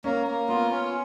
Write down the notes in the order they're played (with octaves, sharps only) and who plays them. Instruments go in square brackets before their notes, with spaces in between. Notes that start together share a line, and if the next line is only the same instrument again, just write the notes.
[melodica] A#3 [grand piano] C#4
[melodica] A#3
[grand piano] B3 [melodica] F4
[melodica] C#4